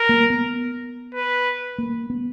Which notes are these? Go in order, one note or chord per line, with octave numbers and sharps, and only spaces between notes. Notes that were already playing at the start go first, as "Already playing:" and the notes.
Already playing: A#4
A#3
B3
B4
A#3
B3